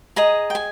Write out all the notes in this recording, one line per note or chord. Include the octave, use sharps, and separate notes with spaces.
G#4 D#5 A#5
G5
G#5